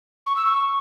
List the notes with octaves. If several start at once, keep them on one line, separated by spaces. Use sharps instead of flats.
C#6
E6
C#6